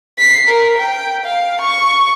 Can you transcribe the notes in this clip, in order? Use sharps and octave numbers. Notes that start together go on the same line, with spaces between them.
B6 C7
A#4
G5
F5
C#6